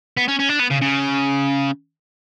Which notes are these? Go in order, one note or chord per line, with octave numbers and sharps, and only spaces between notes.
B3
C#4
C#4
D4
B3
C#3
C#3